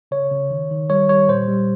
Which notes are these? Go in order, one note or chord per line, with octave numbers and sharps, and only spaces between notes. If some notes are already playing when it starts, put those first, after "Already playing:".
C#3 C#5
C#3
D#3
D#3
G3 C#5
G3 C#5
A#2 C5
G3